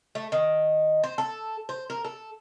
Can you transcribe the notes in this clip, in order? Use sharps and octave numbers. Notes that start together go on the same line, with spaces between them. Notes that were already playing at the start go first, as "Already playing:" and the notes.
A3
D#3
C5
A4
C5
A#4
A4